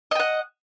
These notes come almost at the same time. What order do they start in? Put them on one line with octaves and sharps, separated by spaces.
D#5 G5 F#5